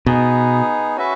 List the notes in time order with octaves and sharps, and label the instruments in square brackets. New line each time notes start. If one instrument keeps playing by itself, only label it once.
[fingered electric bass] B2 [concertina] B3 D#4 G#4
[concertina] C#4 F#4 B4 E5